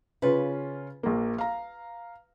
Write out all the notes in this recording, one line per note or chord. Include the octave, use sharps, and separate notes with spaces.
C#3 C#4 F4 B4
A#1 A#3
F5 A#5